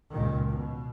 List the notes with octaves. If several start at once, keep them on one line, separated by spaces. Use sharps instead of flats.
C#2 A#2 D#3
B2